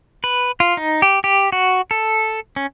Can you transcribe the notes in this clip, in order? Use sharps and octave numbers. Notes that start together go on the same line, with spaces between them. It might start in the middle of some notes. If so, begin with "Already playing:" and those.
B4
F4
D#4
G4
G4
F#4
A4
C#4